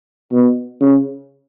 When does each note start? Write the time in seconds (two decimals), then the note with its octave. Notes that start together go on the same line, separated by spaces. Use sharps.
0.32 B2
0.81 C#3